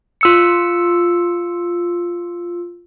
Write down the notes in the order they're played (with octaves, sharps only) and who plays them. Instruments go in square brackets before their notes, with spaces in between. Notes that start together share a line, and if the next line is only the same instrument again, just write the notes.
[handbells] F4 E6 C#7